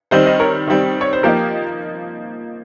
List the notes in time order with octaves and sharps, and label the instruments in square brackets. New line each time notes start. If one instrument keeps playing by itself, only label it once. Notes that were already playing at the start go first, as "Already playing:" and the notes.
[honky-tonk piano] D#3 G3 C4 [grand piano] C5 D#5
[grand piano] C5 D#5
A#4 C#5
[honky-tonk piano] D#3 G3 C4
[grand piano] C#5
C5
[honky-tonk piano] F3 A#3 D#4 [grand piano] G4 A#4